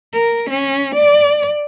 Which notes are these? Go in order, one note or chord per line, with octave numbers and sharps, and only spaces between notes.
A#4
C#4
D5